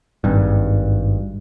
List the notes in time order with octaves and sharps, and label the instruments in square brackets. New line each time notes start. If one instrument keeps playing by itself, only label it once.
[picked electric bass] G#1 G2